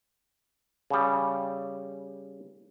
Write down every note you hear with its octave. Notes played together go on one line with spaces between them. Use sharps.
C#3 G3